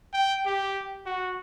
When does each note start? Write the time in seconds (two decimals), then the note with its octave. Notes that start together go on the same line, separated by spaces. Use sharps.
0.13 G5
0.46 G4
1.06 F#4